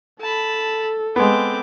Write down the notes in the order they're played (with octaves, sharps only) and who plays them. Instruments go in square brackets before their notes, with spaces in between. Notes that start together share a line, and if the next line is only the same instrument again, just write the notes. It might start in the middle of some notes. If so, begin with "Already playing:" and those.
[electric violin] A4 [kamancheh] A5 B5
[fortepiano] G#3 B3 [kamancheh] C4 D6